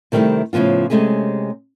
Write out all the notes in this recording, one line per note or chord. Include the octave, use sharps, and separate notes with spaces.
C3 D#3 G3 A3 C4 E4
A2 C#3 F3 B3 F4
C3 G#3 A3 C#4 G#4